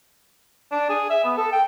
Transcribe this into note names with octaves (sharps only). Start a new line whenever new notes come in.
D4
G#4
E5
B3
A4
G5